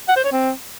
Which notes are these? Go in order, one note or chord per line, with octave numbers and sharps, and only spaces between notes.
F#5
C5
C#5
C4